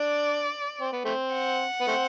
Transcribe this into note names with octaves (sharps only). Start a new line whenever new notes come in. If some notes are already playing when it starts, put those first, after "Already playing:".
Already playing: D4 D5
C4
B3
A3 C4
F#5
B3
A3 C4